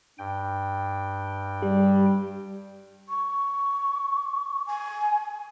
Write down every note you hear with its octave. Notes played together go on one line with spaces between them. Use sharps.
G2 G5
G3 G4
C#6
G#5